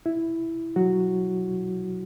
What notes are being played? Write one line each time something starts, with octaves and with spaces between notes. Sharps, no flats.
E4
F#3 F#4